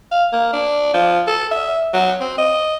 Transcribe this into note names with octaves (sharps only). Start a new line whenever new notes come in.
F5
A#3
D4
F3
A4
E5
F#3
C4
D#5